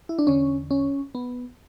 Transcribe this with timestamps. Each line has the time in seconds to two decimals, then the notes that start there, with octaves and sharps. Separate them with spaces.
0.09 E4
0.18 D4
0.27 E2 D3 C#4
0.71 C#4
1.15 B3